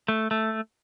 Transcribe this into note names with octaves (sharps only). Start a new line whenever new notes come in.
A3
A3